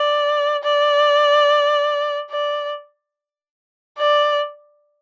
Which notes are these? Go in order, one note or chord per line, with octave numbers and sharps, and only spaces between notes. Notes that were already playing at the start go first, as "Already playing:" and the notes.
Already playing: D5
D5
D5
D5